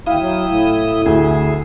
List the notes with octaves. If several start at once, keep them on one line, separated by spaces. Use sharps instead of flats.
D#2 E4 F5 G5 D#6
F#3
A2
D2 E4 G#4